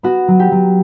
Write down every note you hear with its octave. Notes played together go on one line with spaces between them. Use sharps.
B3 F#4
F#3
G4
F#3